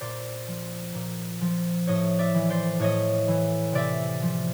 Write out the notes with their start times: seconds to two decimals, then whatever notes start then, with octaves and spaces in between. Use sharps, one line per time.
0.01 A#2 C5 D5
0.48 F3
0.95 A#2
1.41 F3
1.87 A2 C#5 D#5
2.19 D5 E5
2.34 E3
2.50 C5 D5
2.80 A2 C#5 D#5
3.28 E3
3.72 C3 D5 E5
4.22 F3